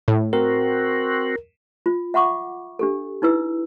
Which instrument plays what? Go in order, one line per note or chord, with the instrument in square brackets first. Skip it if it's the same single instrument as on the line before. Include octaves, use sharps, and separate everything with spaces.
[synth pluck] A2
[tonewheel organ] C4 F#4 [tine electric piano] A#4
[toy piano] F4
E5 F#5 B5 C#6 D6
D4 G4 A4
D#4 E4 B4 E6